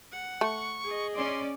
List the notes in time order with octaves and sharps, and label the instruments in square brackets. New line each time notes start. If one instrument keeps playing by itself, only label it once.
[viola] F#5
[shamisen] A3 [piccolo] C#6
[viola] G#4 D#5
[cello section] C#4 D5 [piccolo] C6